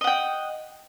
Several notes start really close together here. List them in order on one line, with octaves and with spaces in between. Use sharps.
D#5 F#5 G5